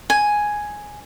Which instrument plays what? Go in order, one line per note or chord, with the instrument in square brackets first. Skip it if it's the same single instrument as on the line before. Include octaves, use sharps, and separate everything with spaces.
[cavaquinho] G#5